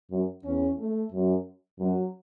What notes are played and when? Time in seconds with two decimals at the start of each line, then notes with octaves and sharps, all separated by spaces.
0.11 F#2
0.44 E2 C#4
0.79 A3
1.12 F#2
1.79 F#2 F#3